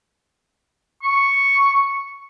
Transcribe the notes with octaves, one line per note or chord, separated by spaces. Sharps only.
C#6